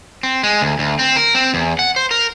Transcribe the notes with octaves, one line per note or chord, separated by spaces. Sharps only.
C4
G#3
D2
D2
C4
A#4
C4
E2
F#5
C5
A#4